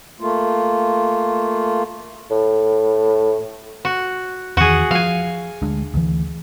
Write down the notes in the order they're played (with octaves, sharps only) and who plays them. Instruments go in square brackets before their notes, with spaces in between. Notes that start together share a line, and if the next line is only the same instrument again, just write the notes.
[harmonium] A3 A#3 F4
[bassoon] A2
[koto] F#4
[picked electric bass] E2 D#3 [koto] F#4 G#4
[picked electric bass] F3 [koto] F5 G#5
[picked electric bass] D2 G#3 D4
D2 E3